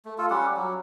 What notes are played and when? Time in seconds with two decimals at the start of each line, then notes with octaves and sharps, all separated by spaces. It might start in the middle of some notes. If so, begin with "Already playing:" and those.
0.05 A3
0.18 F4 A4
0.30 G3 C#4 G4 F#5
0.57 F#3